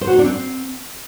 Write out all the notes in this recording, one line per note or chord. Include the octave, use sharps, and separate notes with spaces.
C5
F#4
D#4
D4
C4